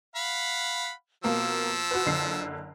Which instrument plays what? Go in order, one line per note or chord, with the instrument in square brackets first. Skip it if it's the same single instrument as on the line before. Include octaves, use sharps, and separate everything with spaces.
[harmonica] F5 F#5 B5
[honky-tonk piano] B2 A#3 [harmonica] F3 E6
[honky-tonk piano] F#4 B4
F#1 D3 C7